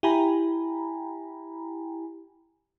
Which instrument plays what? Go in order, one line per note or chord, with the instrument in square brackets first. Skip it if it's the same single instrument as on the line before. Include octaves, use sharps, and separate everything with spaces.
[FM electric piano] E4 G4 G5 G#5 A#5 B5